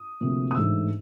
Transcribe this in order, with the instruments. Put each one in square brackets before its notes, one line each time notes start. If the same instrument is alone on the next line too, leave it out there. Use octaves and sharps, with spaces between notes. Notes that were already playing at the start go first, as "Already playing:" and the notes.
Already playing: [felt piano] D#6
D2 C3 F3 A#3
D#6
A1 G#2 E3 A3 D4 E6